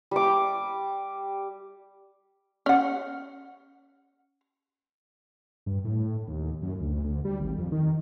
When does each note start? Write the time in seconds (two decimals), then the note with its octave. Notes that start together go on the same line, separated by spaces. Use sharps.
0.11 G3 D6
2.66 C#4 F#5
5.66 G2
5.84 A2
6.28 D#2
6.62 F#2
6.80 D2
7.04 D2
7.25 G3
7.40 G#1
7.58 F2
7.72 D#3